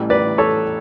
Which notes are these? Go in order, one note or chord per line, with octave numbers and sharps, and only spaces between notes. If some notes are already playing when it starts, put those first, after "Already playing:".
Already playing: A1 A2 E3 G3
B4 D5
A4 C#5